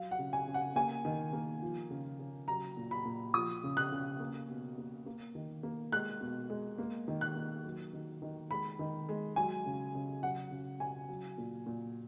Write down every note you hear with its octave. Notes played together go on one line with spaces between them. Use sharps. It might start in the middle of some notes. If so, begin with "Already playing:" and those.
Already playing: F#3 F5
F#5
C#3
G#5
C#3
F#5
A#3 G#5
D#3
A#3
F3
C#3
C#3
F#3 A#5
A#2
B5
A#2
F3 D#6
C#3
F#6
C#3
A#3
B2
A#3
A#3
D#3
A#3
G#3 F#6
B2
G#3
A#3
D#3
F#6
A#3
F#3
D#3
D#3
G#3 B5
D#3
G#3
F#3 G#5
C#3
C#3
F#3 F#5
C#3
C#3 G#5
F#3
A#2
A#2